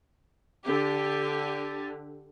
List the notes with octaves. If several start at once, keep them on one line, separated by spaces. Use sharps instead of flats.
D3 G4